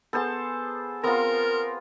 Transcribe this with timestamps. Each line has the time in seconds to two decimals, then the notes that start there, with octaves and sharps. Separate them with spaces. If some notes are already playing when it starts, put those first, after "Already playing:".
0.13 B3 G#4 A4 C5 A5
1.03 B3 C4 F4 A#4 A#5